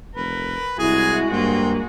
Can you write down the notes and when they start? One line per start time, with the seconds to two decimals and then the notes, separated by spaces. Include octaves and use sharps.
0.15 F1 A#4 B4
0.79 C2 G#3 E4 F#4 G#4 G#5
1.32 G2 A#3 C4 G5